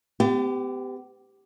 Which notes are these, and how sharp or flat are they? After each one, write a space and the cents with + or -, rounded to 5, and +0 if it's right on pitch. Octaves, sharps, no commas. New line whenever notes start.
B3 +45 G4 +0